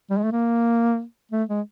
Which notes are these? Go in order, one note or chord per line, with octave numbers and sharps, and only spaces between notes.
G3
G#3
A3
A#3
A3
G#3